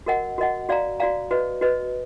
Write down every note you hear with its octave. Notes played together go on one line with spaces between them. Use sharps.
F#4 A#4 D#5 F#5
F#4 A#4 D#5 F#5
F#4 D5 F5 A#5
F#4 D5 F5 A#5
F#4 B4 D#5
F#4 B4 D#5